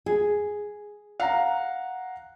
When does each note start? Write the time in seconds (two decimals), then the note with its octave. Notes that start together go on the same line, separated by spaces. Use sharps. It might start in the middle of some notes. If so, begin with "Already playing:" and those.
0.06 G#4
1.20 F5 F#5 A#5